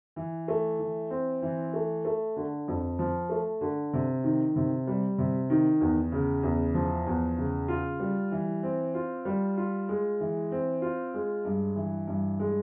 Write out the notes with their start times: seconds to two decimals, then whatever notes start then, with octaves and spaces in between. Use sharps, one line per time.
0.16 E3
0.48 A3
0.79 E3
1.10 C4
1.42 E3
1.74 A3
2.05 A3
2.36 D3
2.68 F2
2.99 F3
3.29 A3
3.61 D3
3.93 C3
4.24 D#3
4.56 C3
4.87 G3
5.18 C3
5.50 D#3
5.81 E2
6.12 C#3
6.43 E2
6.74 F3
7.07 E2
7.38 C#3
7.68 F4
8.00 G3
8.32 E3
8.63 C4
8.94 F4
9.25 G3
9.57 F4
9.89 G#3
10.20 E3
10.52 C4
10.82 F4
11.14 G#3
11.45 G2
11.76 E3
12.08 G2
12.40 G#3